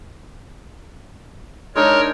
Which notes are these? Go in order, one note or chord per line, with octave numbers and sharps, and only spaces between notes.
G#3 D4 D#4 A#4 C#5